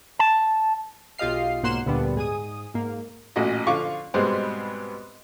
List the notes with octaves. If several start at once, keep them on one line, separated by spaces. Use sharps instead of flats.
A5
B1 F4 G4 D#5 F5 C7
B1 G#2 A#3 F#5 C6 E7
D2 A#2 D3 G3 B3 D4
G#2 G#4 G#5 D#6
G#2 A#3
A1 A#2 F#4 D#5
D3 F3 F4 F5 C#6 D6
G#2 B2 G3 G#3 B3 C4